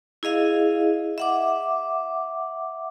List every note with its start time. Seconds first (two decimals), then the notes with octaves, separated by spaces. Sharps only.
0.23 E4 G#4 D#5 F5
1.18 E5 F#5 D6